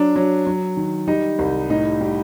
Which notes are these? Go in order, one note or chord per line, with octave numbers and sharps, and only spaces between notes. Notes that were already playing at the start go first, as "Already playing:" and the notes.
Already playing: F#3 D4
F#3
F#3
D#3
G3 D#4
C2
A2 D#4
G3